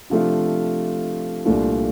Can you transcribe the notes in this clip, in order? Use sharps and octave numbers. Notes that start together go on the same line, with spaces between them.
C3 F3 A3 D4 F4
C2 A#2 A3 D4 F4